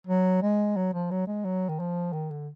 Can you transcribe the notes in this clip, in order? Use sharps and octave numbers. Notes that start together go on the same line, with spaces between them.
F#3
G#3
F#3
F3
F#3
G#3
F#3
D#3
F3
D#3
D3